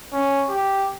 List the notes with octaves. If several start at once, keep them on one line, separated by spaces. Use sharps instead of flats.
C#4
G4